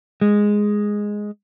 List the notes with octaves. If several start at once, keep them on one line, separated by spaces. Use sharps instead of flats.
G#3